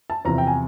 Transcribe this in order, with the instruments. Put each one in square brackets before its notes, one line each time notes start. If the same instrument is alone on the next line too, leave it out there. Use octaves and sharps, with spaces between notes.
[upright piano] A5
E2 C3 F3 A#5
G5
G#5